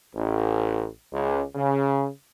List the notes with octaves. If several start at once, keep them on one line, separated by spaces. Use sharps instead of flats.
A1
C#2
C#3